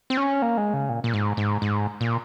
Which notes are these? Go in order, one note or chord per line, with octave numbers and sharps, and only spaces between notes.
C4
C#4
A#3
G#3
C#3
A#2
A#2
G#2
G#2
G#2
A#2